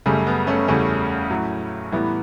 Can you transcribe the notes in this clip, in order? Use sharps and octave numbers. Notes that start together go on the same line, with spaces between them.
F#2 C#3 G3 A3
B3
A3 C#4
E2 C#3 G3 A3 C#4
A2 F#3
A2 E3 G3 B3